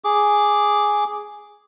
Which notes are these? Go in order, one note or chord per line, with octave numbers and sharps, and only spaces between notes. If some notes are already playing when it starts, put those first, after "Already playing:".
G#4 D6